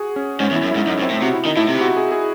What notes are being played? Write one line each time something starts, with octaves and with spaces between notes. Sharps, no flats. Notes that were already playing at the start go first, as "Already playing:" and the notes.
Already playing: F#4 G#4
C#4
G#2 C#4
E2
E4
F#2
G#2 E4
F#2 D#4
F#2
C4
A2
C3 F#4
E4
D#3 D#4
A2 E4
C3
F#4
G#4
G#4